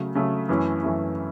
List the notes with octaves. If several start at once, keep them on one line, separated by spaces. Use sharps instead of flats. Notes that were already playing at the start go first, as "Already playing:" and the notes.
Already playing: C#3 F#3 A3
C#3 F#3 A3
F#2 E3 A3 C#4 E4
F#2 E3 A3 C#4 E4